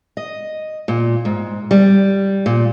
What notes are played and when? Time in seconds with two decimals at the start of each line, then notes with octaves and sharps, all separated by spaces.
0.17 D#5
0.88 A#2
1.25 G#2
1.71 G3
2.46 A#2